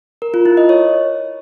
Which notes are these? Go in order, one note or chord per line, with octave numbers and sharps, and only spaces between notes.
A#4
F4
E4
D#5
C#5